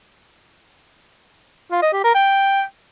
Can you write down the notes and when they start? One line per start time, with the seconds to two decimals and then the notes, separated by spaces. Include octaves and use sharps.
1.72 F4
1.82 D#5
1.93 G4
2.04 A#4
2.15 G5